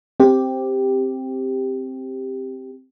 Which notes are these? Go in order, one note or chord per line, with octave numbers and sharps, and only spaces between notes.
C4 G4